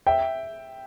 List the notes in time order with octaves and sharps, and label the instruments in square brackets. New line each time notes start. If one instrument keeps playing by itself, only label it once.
[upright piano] E5 G5